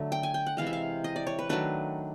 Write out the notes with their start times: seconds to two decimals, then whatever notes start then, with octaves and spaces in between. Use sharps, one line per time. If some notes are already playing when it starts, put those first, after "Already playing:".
Already playing: D3 F#3 A3
0.12 G5
0.23 G#5
0.34 G5
0.46 F#5
0.57 C3 E3 G#3 F5
0.67 E5
0.73 F5
1.04 D#5
1.16 D5
1.27 C#5
1.39 B4
1.49 D#3 F#3 A3 D4 B4